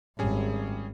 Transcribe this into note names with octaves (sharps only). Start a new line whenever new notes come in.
G#1 G3 C#4 G#4